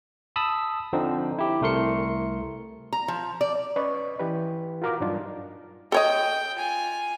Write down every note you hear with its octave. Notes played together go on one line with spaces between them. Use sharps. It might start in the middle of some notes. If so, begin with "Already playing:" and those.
A5 B5 D#6 E6
D3 F3 C4 D#4
E4 G4
C2 A3 A#4 C6 C#7
A#5
F3
D5
C#4 B4 D5 D#5 C#6
E3 G4 B4
F4 F#4 A#4 F5 D6
G2 F#3 G3 D4 D#4 F4
A4 C#5 D#5 G5
F4 G#5